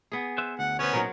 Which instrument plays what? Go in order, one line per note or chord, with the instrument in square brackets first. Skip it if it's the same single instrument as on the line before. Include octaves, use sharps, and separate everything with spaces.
[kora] B3 G#4
[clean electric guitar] B4 C5 E5
[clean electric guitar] D2 [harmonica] F#5
[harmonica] B3 C#4 [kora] C5 C#5
[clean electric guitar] A#2 D#4 [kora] F#3 A#4